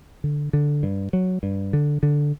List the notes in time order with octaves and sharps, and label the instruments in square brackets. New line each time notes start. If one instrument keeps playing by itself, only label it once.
[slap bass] D3
D3
G2
F#3
G2
D3
D3